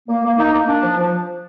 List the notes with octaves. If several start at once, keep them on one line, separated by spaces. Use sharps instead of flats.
A#3
A#3
D#4
A#3
D4
F3
F3